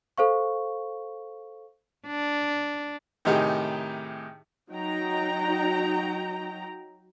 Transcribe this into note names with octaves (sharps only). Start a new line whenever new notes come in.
A4 C5 F5 C#6
D4
A2 C3 D#3 D#4 G4 G#4
F#3 D#4 G5 A#5